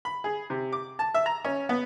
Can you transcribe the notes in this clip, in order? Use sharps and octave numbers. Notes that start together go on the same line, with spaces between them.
B5
G#4
C3
D6
A5
E5
A#5
C#4
B3